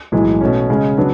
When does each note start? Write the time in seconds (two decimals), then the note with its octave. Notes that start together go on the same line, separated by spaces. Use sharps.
0.12 B1 A2 E3 G#3
0.41 B2 A3 C#4
0.69 C#3 G#3 C#4
0.98 C#3 F#3 B3 D4